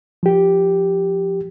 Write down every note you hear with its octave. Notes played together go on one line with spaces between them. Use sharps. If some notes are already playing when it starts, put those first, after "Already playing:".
F3 G4